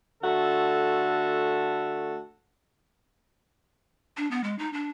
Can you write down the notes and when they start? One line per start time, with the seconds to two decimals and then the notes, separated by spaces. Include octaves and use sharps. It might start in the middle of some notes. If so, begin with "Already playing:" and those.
0.23 D3 A3 F#4 A4
4.17 D4
4.31 B3
4.44 G#3
4.59 D#4
4.73 D4